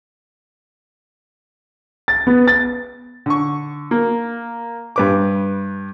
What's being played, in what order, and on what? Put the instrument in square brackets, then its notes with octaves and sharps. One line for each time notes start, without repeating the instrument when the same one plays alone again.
[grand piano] A6
B3
A6
[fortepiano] D3 C#6
A#3
G2 B4 D6